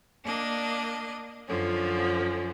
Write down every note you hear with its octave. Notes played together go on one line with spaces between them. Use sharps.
A#3 D4 D#5
F#2 D3 F3 C#4